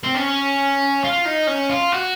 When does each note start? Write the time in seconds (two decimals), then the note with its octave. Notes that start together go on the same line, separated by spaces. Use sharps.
0.03 C4
0.15 C#4
1.04 F4
1.25 D#4
1.47 C#4
1.69 F4
1.92 F#4